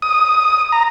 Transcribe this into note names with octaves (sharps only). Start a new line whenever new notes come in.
D#6
A#5